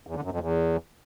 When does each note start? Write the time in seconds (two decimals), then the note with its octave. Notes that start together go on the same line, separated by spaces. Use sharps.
0.07 E2
0.15 D3
0.23 F#2
0.32 F2
0.40 E2